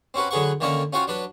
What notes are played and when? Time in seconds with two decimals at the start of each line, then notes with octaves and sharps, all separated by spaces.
0.14 C4 C#4 F#4 B4
0.31 D3 F#3 G#4 B4 F#5 C#6
0.60 D3 D#3 A#3 C#4 C#5 D5
0.93 C#4 F4 F#4 C5 F5 G5
1.07 F#3 D4 B4